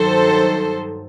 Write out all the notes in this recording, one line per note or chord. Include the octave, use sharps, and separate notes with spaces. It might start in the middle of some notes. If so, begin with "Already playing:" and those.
Already playing: G2 D#3 F#3 A4 C5